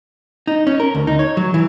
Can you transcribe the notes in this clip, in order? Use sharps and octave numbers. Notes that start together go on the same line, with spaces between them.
D#4
C#4
A#4
D2
D#4
C#5
F#3
E3